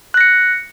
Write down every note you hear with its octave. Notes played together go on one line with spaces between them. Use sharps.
F#6 A#6 C#7